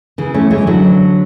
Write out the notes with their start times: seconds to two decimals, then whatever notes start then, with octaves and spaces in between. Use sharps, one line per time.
0.18 C#3 E3
0.34 A3 C#4
0.51 E3 G#3
0.67 D3 F#3